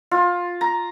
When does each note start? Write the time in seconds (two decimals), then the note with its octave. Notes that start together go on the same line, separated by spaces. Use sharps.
0.11 F4
0.61 A#5